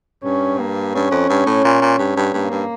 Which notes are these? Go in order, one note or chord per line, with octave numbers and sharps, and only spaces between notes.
G2 C#4
A#3
G2 C#4
F2
G2
A2
A#2
A#2
G2
G2
G2 A#3
G2